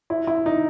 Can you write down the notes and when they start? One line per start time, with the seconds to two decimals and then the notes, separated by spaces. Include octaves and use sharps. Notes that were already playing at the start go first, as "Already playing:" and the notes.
0.10 E4
0.27 E4
0.46 D#4